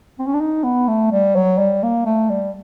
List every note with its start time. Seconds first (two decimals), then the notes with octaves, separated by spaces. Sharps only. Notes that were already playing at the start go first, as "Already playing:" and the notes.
0.19 C4
0.26 C#4
0.33 D4
0.41 D#4
0.63 B3
0.88 A3
1.11 G3
1.35 F#3
1.59 G3
1.83 A#3
2.06 A3
2.29 G3